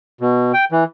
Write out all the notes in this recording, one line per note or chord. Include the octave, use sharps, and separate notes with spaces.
B2
G5
E3